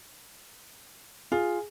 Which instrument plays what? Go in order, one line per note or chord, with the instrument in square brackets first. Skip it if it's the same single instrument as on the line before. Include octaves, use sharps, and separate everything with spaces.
[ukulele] F4 [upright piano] G#4